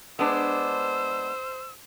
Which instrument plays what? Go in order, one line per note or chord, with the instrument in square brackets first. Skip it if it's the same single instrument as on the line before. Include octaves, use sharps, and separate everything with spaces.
[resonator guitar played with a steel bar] G#3 B3 D4 [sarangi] C5 [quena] E6